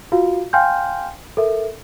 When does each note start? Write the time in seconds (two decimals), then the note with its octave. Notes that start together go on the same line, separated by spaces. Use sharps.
0.12 F4 F#4 F5
0.53 F5 G5 G#5 C6 F6 G6
1.37 A4 A#4 E5